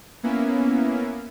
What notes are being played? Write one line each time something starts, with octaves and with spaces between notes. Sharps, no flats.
A#3 B3 C#4 E4